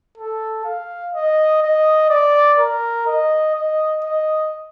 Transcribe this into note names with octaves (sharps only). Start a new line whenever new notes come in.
A4
F5
D#5
D#5
D5
A#4
D#5
D#5
D#5